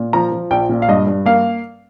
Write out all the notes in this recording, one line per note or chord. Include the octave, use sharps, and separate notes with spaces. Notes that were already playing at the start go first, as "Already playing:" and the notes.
Already playing: A#2
F3 A#5
F3
A#1 G5
A#2
F5
G2 D#5
G2
A#3 F5